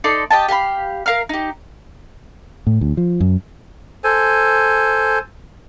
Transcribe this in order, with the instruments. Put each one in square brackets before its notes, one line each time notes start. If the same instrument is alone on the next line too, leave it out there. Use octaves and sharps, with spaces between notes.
[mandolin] D#4 A4 D5 C6
G4 D#5 G5 A5
G4 F5 A5 B5
A#4 F5 A#5 F6
D#4 G4
[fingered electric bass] A2
D2
F3
F#2
[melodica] A4 C5 G#5